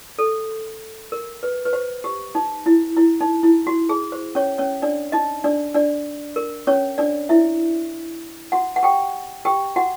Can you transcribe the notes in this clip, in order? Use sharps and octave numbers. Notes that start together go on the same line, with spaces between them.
A4
A#4
B4
B4
C5
G4
D#4
E4
E4
D#4
E4
F#4
G#4
C5
C#4 C#5
C#4 C#5
D4 D5
D#4 D#5
D4 D5
D4 D5
A#4
C#4 C#5
D4 D5
E4 E5
F#4 F#5
F#5
G4 G5
G4 G5
F#4 F#5